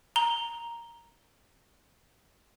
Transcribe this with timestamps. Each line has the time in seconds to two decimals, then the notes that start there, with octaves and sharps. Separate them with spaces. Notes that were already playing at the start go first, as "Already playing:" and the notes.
0.16 A#5 G7